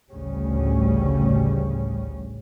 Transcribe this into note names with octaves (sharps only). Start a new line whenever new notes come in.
A1 D2 C#3 G3 C#4